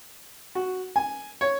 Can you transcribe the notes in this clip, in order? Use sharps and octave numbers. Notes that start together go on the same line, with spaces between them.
F#4
G#5
C#5